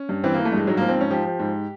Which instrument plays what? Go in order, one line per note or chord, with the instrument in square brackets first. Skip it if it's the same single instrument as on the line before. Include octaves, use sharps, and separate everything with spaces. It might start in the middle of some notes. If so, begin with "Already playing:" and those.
Already playing: [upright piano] C#4
G2
E3 C4
E3 A#3
A3
G2 G#3
G#2 F#3
F3 A#3
C4
G#2 C#4
F3 G4
F3
G#2